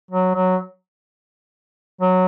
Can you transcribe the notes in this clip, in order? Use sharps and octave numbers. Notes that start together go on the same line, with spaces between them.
F#3
F#3
F#3